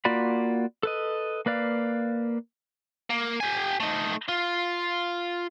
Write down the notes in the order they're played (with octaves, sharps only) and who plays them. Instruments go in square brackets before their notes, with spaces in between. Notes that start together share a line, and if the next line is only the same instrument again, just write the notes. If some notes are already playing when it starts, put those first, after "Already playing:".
[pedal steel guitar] A#3 F4 F#4 D5 B5
A4 B4 D#5
A#3 B4 D5 F5
[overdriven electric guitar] A#3
G4 G#5
A3 D#4
F4